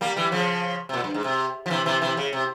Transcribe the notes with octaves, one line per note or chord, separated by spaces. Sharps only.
G3 A#3
E3 G3
C#3 F3
C3
A#2
G2
G#2
C3
F3
C3 E3
C3 E3
C3 E3
C#3
C3